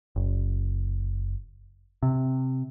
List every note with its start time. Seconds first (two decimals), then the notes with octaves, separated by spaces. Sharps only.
0.16 F#1
2.03 C3